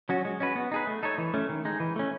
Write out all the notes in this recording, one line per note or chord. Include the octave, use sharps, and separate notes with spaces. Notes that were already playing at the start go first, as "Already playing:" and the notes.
F#3 C#4 F#4
G#3
C#4 F#4 B4
B3
D#4 G#4 B4
A3
D#4 A4 C#5
E3
A3 C#4
D#3
G#3 D#4
E3
A3 C#4